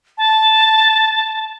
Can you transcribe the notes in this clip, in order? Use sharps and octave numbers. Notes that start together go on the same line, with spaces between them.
A5